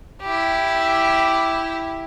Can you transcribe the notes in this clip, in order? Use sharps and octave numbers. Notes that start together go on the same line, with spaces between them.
E4 G4